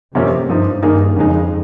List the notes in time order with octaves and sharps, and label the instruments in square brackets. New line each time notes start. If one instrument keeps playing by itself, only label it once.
[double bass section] F2 [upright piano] C3 F3 A#3 C#4 G4
[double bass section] G2 [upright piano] F3 C4 D#4
[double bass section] G2 [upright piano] D#3 A#3 D#4 G#4
[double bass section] F2 [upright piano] C#3 G#3 D#4